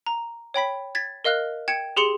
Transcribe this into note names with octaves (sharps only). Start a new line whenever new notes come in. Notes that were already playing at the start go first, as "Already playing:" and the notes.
A#5
C#5 G5 B5 B6
G#6 A6 B6
A#4 D#5 F5 F6 F#6
G5 G#6 C#7 E7
G4 G#4 C6 C#7 F7